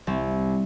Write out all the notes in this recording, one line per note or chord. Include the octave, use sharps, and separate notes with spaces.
C2 C4